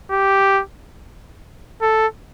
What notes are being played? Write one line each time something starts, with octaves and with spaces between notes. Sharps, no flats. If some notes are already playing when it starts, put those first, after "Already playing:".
G4
A4